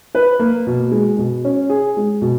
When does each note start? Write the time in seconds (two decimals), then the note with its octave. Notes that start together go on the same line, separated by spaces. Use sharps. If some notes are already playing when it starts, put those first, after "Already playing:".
0.15 B4
0.39 A#3
0.67 B2
0.92 G#3
1.18 B2
1.45 C#4
1.70 G#4
1.97 G#3
2.22 B2